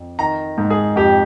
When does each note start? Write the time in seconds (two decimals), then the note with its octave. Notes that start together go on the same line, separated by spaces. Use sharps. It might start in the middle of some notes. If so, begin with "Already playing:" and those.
Already playing: F2
0.19 D#3 A#5
0.58 G#2
0.70 G#4
0.96 F2 G4